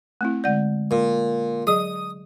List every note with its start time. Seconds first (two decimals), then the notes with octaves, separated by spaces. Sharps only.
0.21 A3 C4 E4
0.44 D3 G#3 D5 F#5 G6
0.91 A#2
1.67 F#3 G#4 D#5 D#6